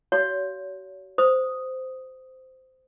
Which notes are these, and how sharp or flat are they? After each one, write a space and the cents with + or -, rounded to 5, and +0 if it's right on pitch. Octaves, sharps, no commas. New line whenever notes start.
F#4 +40 C#5 +35 F5 +0
C5 -15 D#6 +0